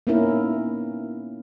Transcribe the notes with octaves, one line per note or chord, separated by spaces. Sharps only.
A#3 B3 C#4 D#4 E4 A#4